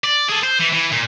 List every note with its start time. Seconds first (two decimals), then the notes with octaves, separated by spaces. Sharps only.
0.04 D5
0.29 G#4 A4
0.43 C5
0.59 E3
0.73 E3
0.92 A#2